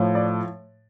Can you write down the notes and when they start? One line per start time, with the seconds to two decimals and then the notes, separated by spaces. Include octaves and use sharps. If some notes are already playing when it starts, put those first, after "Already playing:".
Already playing: A2 F3
0.15 D5